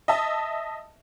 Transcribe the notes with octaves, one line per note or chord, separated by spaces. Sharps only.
D#5 E5 A5